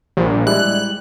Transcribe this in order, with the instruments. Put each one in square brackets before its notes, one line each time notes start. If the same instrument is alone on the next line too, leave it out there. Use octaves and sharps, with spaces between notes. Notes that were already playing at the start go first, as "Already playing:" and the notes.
[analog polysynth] A#1 [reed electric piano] G3
[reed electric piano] G3 G#3 E4 [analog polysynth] F#6